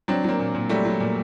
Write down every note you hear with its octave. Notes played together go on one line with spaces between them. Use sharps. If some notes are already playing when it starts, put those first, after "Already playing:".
F#3 C4 D4
F#3 A#3 C4
A#2
A#2
F#3 G3 A3
F#3
A#2